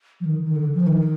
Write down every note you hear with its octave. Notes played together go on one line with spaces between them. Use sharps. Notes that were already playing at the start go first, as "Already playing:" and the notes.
F3
D#3
D#3
D3
F3
D#3